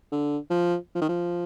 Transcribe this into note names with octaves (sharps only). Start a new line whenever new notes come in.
D3
F3
F3
D#3
F3